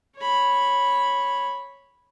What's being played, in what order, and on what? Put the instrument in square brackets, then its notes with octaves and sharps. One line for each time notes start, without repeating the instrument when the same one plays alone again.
[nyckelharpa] C#5 B5